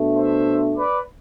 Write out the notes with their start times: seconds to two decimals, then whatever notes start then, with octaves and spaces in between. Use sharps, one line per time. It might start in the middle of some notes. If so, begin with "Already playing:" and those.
Already playing: B2 A3 D4
0.15 C5 E5
0.76 B4 D5